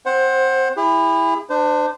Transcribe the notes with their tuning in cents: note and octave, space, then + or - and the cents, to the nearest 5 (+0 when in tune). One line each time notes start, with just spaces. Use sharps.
C4 +0 C5 +20 F#5 +0
E4 +5 G#4 -45
D4 +25 C5 -25